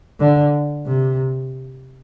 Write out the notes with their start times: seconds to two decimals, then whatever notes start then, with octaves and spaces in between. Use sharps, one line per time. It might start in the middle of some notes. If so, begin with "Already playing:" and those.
0.20 D3
0.87 C3